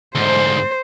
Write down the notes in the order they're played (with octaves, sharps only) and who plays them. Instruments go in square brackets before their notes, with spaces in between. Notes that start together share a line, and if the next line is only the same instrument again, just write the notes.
[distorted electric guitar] D2 G#2 [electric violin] C5